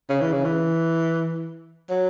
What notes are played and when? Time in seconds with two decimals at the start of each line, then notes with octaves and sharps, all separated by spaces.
0.09 C#3
0.21 E3
0.32 C#3
0.45 E3
1.90 F#3